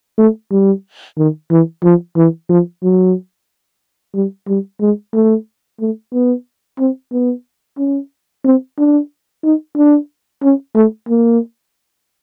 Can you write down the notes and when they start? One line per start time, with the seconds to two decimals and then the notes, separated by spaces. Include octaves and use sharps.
0.18 A3
0.51 G3
1.18 D#3
1.51 E3
1.83 F3
2.16 E3
2.50 F3
2.83 F#3
4.15 G3
4.48 G3
4.81 G#3
5.14 A3
5.80 A3
6.13 B3
6.79 C4
7.12 B3
7.78 C#4
8.45 C4
8.78 D4
9.44 D#4
9.77 D4
10.43 C#4
10.75 A3
11.09 A#3